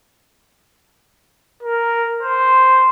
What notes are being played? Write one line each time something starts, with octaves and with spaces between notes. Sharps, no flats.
A#4
C5